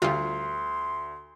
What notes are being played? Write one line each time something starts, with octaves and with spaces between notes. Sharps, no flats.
D2 G3 F4 C6